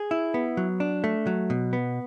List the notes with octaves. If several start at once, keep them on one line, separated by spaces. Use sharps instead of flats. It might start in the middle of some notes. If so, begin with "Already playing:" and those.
Already playing: G#4
E4
B3
F#3
D4
A3
F#3
B2
B3